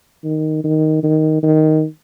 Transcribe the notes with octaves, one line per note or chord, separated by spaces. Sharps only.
D#3
D#3
D#3
D#3